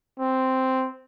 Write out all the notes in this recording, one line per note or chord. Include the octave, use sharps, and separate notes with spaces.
C4